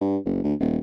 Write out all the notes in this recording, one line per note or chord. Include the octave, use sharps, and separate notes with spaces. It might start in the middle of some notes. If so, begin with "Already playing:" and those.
G2
F#1
D2
D#1